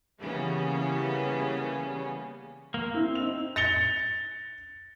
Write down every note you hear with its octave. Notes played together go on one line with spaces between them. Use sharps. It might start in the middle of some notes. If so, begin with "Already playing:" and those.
C#3 E3 G3 A#3 B3 C#4
A#3
C4 E4
D#4 F7
A6 A#6 C#7 F7 G7